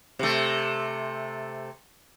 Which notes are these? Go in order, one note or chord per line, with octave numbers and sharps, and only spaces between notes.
C3 A3